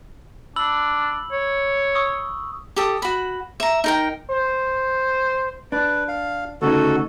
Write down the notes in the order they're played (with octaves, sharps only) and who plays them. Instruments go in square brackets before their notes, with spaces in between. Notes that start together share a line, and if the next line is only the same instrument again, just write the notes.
[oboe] D4 [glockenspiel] B5 E6 F#7
[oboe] C#5
[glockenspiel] C#6 D#6 E6
[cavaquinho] G4 A4 D#6
F#4 B5
E5 A#5
D#4 A#4 G5
[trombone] C5
[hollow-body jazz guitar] D4 [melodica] B4
[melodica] F5
[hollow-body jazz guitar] D2 C#3 D#4 [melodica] F#4 A4